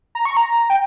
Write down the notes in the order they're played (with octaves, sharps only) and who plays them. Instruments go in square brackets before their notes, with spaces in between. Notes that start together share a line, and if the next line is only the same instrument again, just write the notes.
[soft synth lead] A#5
C#6
A#5
G5